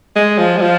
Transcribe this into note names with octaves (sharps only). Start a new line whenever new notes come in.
G#3
F3
G#3
F3